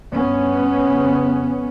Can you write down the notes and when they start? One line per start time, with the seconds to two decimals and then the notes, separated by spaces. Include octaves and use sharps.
0.13 G2 B3 C#4
0.85 F2 C#3